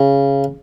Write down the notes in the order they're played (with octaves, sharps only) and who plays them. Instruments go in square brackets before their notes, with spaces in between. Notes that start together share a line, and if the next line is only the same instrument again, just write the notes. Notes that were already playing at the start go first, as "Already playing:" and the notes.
Already playing: [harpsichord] C#3